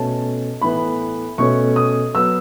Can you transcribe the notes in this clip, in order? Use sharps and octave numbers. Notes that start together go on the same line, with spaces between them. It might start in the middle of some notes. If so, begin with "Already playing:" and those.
Already playing: B2 A3 C#4 A5
A2 E3 B3 B5
B2 A3 C#4 C#6
D#6
F#3 B3 E6